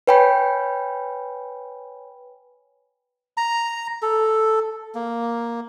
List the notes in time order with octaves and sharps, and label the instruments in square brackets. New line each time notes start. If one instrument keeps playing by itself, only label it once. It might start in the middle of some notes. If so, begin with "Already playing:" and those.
[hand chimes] B4 C#5 G5 G#5 B5
[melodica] A#5
A4
A#3